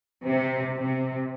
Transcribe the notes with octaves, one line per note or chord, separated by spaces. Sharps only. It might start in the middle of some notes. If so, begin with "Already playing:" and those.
C3
C3